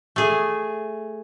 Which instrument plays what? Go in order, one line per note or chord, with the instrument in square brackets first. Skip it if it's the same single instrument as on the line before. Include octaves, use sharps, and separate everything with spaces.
[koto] A3 G#4